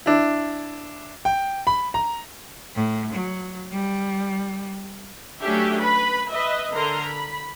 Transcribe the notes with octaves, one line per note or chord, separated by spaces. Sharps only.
D4 E4
G5
B5
A#5
A2
F#3
G3
F#3 A3 C#4 D4 G4 E5
B4 B5
B4 D#5 E5
D3 A#4 A#5 C6
B5